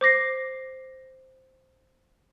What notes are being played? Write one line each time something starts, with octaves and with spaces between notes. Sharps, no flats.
C5 D6 A#6 C7